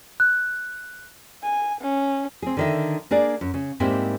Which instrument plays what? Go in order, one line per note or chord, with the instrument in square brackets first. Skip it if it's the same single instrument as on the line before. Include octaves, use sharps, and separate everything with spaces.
[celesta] F#6
[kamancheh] G#5
C#4
[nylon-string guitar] C4 G#4
D3 D#3 E5
A#3 D4 G#4 D5
F#2
C#3
G#2 G3 A#3 C4 E4